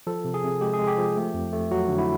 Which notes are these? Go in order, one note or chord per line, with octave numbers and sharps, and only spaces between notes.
F3 A4
C3
G#4
C3
G#3 G4
G#4
G#3
G4
F3
A3
F2
A3
F#3 F#4
D3
E4